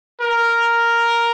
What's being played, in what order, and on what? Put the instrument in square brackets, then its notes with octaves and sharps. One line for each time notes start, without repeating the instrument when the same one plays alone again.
[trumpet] A#4